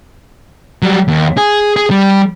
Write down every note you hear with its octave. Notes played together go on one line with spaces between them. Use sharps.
F#3 G3
D#2
G#4
G#4
G3